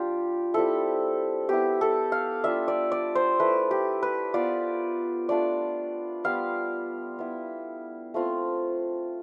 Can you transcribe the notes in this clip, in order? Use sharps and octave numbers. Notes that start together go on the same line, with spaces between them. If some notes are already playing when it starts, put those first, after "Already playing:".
Already playing: G3 D4 F4 G4
G3 C4 E4 A4
B3 E4 G4
A4
F5
G3 D4 F4 E5
D5
D5
C5
A3 E4 B4
G4
B4
B3 F4 D5
A3 D4 F4 D5
G3 B3 F4 F5
B3 E4
A3 C4 F4